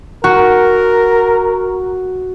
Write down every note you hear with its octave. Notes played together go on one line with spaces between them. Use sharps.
F#4 A#4